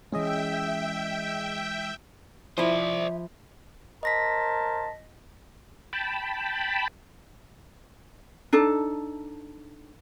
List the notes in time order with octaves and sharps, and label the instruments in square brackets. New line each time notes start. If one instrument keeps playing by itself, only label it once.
[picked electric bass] E3 G#3 [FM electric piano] C#4 G#4 D#5 [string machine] E5 G5
[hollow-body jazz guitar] F3 E4 [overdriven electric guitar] C5 D5 [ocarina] E5
[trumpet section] A#4 C5 A5 [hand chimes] D#5 A#6 B6
[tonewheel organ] G5 A5 B5
[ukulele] D4 D#4 A4